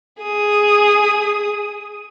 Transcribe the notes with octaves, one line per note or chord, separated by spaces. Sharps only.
G#4 D#6